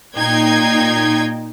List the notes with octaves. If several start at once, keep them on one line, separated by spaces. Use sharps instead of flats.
A#2 D#4 G5 G#6 C7